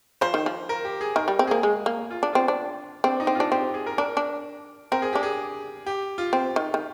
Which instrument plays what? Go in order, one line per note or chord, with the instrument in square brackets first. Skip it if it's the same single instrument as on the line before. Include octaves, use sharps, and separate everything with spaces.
[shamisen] F3 [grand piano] C5
[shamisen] D#3
F3
[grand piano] A#4
G4
G#4
[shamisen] D#3 [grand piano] A#4
[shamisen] G3
C4
[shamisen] A#3 [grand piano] G#4
[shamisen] G#3
A#3
[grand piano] F4
[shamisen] D4
[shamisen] C4 [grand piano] F4
[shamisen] D4
[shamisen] C4 [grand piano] D4
[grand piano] D#4
[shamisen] C4
[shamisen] D4 [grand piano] F4
[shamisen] C4 [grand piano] G4
[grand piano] G#4
A#4
[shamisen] D4 [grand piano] A#4
[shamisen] D4
[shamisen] C4 [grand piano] A#4
[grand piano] G#4
[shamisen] D4 [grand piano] G4
[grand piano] G#4
G4
F4
[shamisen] C4
D#3
D#3